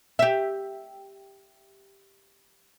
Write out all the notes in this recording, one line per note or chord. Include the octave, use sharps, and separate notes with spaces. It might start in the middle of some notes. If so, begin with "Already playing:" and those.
G4 E5